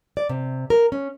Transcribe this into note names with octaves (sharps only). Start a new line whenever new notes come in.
D5
C3
A#4
C#4